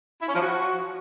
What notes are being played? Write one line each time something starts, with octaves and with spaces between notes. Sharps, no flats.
E4
C#4
F3
F#4